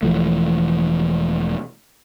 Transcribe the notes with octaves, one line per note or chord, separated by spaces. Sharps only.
E1 E3 F3 A3